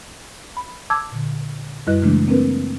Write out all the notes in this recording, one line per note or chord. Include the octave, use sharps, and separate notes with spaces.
B5
A5 D6 E6 G#6
A#2 D3
F#2 G3 E4 B4 D#5 F#6
C#3 E3 G#3 A3 D4
A#3 C4 D4 A#4 B4